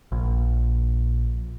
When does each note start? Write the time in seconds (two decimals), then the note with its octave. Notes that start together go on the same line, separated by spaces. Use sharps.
0.12 A#1